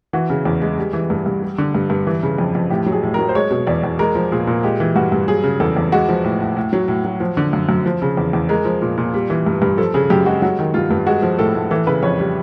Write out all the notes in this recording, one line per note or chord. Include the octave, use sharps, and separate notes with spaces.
E3 F#4
C#3
E2
G#3
G3
E3
G2
G2
G3
D3
G2
G2
E3
C#3
F2
F2
A2 G4
F#3
G#4
A2
F#3 A#4
C5
G#3 C#5
B2
E2 D5
E2
G#3 A#4
F3
A#2 G#4
A#2
G#3 G4
E3
G2 F#4
G2
F#3 G#4
C#3
E2 A4
E2
G#3 F#4
F3
A2
A2
A2
F#3
A2
F#3
F3
D3
F#2
F#2
F3
C#3
E2
E2
G#3 A#4
F3
A#2
A#2
G3
E3
G2
G2
F3 A4
C#3 G#4
F#2 G4
G#3 F#4
F#3 F#4
D#3
G2 F4
G2
G#3 F#4
F3
A2 A4
A2
E3 A4
C#3 B4
F2 C#5
G3